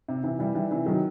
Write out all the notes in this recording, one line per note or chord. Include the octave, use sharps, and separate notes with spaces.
C3
C3 E3
E3 G3
E3 G3
C3 E3
D#3 F#3